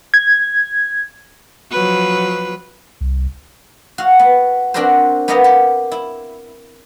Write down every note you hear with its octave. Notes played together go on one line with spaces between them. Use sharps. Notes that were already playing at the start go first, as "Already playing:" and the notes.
G#6
F3 F#3 B4
C2
F#4 F5
B3
C4 D4 F#4 G4 A#4 C5
B3 G4 A#4 D#5 F5 A#5
G4
E4